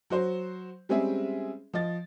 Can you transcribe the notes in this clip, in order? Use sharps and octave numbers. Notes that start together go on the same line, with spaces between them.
F#3 F#4 C5
G3 G#3 C4 C#4 G#4 E5
F3 D#5 A6